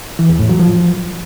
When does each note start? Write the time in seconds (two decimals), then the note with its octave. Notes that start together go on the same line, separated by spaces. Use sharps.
0.19 E3
0.29 E2
0.39 A2
0.49 F#3
0.59 F3